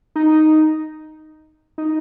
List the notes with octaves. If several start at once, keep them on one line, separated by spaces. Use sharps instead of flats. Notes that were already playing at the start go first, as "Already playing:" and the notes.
D#4
D#4